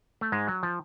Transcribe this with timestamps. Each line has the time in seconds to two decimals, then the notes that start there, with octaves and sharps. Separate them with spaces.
0.21 A3
0.32 G#2 G#3
0.48 F#3
0.63 F3